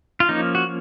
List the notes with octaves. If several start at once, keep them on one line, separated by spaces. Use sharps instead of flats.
F4
F3 A#3 C#4 D#4
F#4